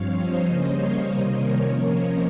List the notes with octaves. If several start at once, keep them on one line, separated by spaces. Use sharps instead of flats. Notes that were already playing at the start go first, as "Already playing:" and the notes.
Already playing: G2 F3 C4 C#5 F5
C5 D#5
C#3 G3 A#3 C#4
C#5 F5
C3 D#3 G3 A#3 C5 D#5
A#4 C#5
C3 F3 A#3 C#4
C5 D#5